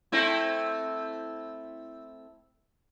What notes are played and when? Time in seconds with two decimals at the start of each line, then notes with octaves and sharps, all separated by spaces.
0.12 A3 C4 E4